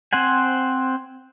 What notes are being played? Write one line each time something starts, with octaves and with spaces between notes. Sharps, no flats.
C4 C5 F#5 G#5